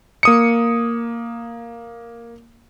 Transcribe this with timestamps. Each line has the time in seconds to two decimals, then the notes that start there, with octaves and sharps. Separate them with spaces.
0.23 A#3 D#6 C#7